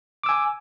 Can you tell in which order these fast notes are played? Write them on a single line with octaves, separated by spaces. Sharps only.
D6 E6 G#5